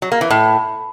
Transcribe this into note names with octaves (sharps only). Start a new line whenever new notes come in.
F#3
A#3
E3
A2